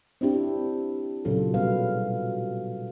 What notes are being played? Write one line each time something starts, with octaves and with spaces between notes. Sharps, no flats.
C4 D4 E4 G4
A#2 C#3 F#3 F4 A4
B2 G3 B4 F5